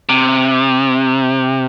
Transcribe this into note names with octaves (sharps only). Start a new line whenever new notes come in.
C3